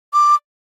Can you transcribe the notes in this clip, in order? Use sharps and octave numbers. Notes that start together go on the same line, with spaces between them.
D6